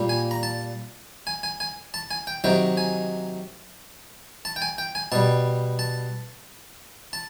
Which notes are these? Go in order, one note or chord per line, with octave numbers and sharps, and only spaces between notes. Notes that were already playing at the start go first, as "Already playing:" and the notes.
Already playing: A#2 G3
G#5
A#5
A5
G#5
G#5
G#5
A5
G#5
G5
C3 D#3 F#3 G5
G#5
A5
G5
G#5
G5
G#5
B2 G3 A5
A5
A5